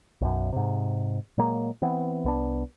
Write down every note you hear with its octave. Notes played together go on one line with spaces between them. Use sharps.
B1 F#2
G#2 C3
A#2 F#3 G#3 A#3
E3 B3 C4
C2 B3 D4